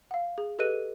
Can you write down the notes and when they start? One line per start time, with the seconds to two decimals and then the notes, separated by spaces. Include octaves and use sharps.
0.11 F5 F#5
0.38 G#4
0.59 G4 A4 B4 D#5 F#6 D#7